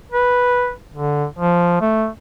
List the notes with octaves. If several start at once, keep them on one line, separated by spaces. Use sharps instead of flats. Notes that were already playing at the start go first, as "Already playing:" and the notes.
B4
D3
F3
A3